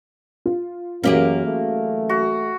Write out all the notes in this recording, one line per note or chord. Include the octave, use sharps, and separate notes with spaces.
F4
F#2 E3 F#3 A#3 C#4 G4 G#4
A3
F#4